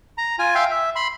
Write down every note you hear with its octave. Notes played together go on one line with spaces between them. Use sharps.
A#5
F4 G#5
E5 F5 G5 C6
E5
B5 C6